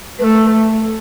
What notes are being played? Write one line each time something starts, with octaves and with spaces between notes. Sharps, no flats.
A3 A4 B4